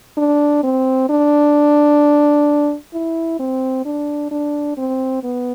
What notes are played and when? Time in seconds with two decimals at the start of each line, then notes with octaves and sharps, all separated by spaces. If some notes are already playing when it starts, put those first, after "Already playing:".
0.18 D4
0.64 C4
1.09 D4
2.94 E4
3.40 C4
3.86 D4
4.31 D4
4.77 C4
5.23 B3